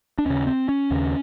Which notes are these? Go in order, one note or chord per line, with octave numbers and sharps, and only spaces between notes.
D4
D#2 C#3 C#4
C4
C#4
D#2 C#3